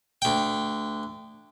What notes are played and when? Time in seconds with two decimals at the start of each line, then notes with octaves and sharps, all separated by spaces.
0.22 D2 G5